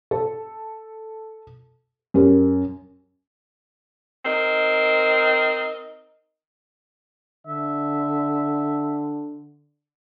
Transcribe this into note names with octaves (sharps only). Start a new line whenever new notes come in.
A4
F#2 G4 A#4
C4 D#4 A#4
D3 E5